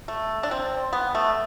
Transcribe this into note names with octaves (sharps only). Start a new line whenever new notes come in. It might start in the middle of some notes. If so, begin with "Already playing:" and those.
A3
D4
C4
B3
A3